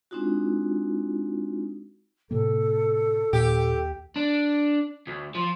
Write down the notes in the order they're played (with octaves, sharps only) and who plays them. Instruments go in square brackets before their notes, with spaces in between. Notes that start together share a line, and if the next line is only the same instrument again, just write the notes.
[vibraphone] G#3 C4 D4 D#4 F4 F#4
[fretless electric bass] A2 C3 A#3 [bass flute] A4
[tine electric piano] D#2 [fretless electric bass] A#2 [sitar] G4
[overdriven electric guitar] D4
D2
F3